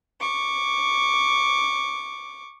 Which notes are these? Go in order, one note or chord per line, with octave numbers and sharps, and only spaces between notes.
C#6 D6